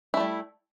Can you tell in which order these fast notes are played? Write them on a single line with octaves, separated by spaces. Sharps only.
E4 A3 G3